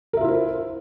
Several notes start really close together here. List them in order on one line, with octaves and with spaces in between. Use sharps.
A#4 E5 F4 E4 C5